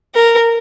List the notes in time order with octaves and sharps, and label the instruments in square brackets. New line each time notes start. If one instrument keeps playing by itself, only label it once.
[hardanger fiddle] A#4